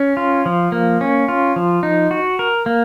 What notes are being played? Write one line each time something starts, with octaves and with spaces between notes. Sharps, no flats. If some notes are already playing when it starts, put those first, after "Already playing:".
Already playing: C#4
F4
F3
A#3
C#4
F4
F3
D#4
F#4
A#4
A#3